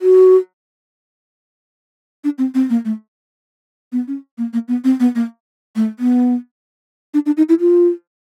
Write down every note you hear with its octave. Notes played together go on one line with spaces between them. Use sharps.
F#4
D4
C4
C4
A#3
A3
B3
C#4
A#3
A#3
B3
C4
B3
A#3
A3
B3
D4
D4
D#4
E4
F4